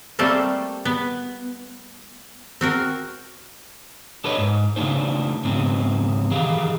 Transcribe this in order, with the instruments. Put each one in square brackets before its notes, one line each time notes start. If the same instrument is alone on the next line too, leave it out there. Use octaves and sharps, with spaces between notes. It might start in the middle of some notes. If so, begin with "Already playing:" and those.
[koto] G3 A3 A#3 C4 A4 C5
B3
C4 F#4 A#4
[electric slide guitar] D4 A4 B4 C#5 D#5
G#2
C#3 A3 D4 D#4 C5
G#2 C#3 B3 C4
D#3 E3 G4 G#4 F5